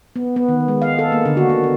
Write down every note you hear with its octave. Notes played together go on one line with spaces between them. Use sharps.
B3
B3
D#3
G#3
F5
A4
A#3
D3
F#4
A#3
B3